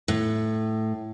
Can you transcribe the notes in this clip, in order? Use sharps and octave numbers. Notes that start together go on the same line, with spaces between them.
A2